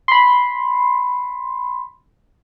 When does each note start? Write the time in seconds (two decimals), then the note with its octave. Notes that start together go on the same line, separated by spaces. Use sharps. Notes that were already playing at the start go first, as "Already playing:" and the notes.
0.08 B5 C6